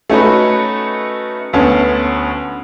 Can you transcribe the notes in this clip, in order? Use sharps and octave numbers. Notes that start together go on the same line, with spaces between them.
A3 C#4 D#4 F#4 A4 B4
D2 B3 C#4 A5